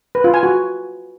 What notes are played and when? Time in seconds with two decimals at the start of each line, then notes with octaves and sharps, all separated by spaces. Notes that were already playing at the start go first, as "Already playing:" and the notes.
0.15 B4
0.24 F4
0.34 G#5
0.43 F#4